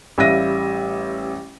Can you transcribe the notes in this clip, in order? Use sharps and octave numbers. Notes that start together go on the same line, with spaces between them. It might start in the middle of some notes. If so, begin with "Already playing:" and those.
A1 G3 E5 F5 A#6 D#7